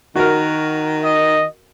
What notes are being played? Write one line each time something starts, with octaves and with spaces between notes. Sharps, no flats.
D#3 F#4 A#4
D#5